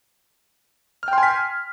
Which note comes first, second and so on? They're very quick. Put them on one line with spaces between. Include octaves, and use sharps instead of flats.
F6 G5 C6 G#5 B6